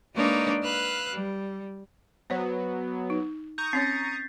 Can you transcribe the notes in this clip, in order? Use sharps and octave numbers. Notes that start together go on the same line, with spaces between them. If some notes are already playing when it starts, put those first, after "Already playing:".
G#3 A#3 D4 D#4 B4 C#5
B4 F5 E6 F#6
G3
F#3 B3 C5 C#5
D#4
A#5 C#6 D#6 G6
C4 C#4 C#5 A6 B6 C7